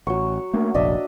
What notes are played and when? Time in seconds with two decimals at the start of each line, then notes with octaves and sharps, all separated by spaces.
0.07 A1 F#3 C#6
0.53 A3 A#3 D4
0.74 F1 A#1 D4 D#5 E5